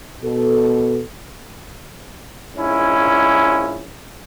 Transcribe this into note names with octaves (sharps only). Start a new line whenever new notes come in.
B2 A4
A#1 G#2 C#4 E4